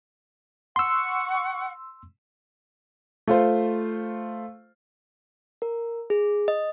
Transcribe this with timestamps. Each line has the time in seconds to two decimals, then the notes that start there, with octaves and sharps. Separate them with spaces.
0.76 F#5 C6 C#6 E6
3.28 A3 F4 C5
5.62 A#4
6.10 G#4
6.48 D#5